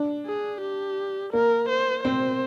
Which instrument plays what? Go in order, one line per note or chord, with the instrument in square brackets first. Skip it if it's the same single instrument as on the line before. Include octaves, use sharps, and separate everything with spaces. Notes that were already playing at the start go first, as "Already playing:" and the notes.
Already playing: [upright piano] D4
[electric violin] G#4
G4
[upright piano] A#3 [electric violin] A#4
[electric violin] C5
[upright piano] C4 [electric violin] C5